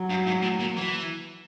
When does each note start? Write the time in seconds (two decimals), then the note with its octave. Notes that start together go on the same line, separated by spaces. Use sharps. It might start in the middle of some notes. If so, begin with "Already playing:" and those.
Already playing: F#3
0.10 G2
0.27 G#2
0.42 A2
0.60 A#2
0.77 E3